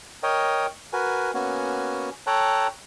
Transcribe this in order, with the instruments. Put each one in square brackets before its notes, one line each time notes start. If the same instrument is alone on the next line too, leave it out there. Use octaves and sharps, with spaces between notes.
[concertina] A#4 C#5 D#5 G5
F#4 A#4 B4 G#5
A#3 B3 C#4 F#4 G#5
A4 C#5 G5 A5 A#5 F#6